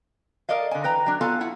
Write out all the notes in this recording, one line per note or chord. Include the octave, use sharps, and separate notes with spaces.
A4 A#4 D5 D#5 F5
D3 G#5
E3 B4 G5 A#5
F#3 D4
B3 F4 F#4 A4 F5 G#5
E4 F#5